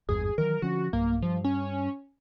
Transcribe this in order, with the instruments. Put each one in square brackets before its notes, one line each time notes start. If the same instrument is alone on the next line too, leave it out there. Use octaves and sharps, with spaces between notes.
[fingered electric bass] G#1 E2 G2 [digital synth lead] G#4
[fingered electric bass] D#3 E3 F#3 [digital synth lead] A#4
[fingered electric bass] D3 F3 C#4 [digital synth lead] F#4
[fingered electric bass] B1 G2 [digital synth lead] A#3
[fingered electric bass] G2 [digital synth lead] F3
[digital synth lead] C#4